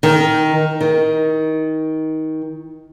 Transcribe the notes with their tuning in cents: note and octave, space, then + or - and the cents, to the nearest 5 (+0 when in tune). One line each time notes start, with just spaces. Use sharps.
D#3 +10
D#3 +20